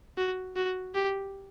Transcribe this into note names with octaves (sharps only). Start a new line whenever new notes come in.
F#4
F#4
G4